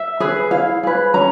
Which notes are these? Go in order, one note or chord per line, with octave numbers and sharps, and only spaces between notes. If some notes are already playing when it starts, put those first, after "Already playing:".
Already playing: E5
G#4 B4
E4 F5
G#4 B4
C#4 A#5